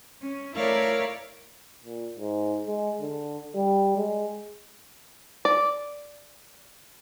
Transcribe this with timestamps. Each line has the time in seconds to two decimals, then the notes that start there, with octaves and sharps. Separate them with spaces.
0.20 C#4
0.55 A3 E4 A#4 C#5 D5 F5
1.84 A#2
2.17 G#2
2.67 G#3
3.01 D3
3.56 G3
3.98 G#3
5.45 D5